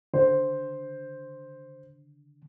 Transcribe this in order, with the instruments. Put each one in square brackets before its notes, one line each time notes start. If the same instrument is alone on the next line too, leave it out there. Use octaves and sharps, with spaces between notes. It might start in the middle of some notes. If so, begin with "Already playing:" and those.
[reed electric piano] D3 [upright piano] C5